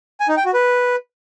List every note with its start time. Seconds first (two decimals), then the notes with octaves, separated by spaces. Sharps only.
0.20 G#5
0.29 D#4
0.37 G5
0.45 F#4
0.54 B4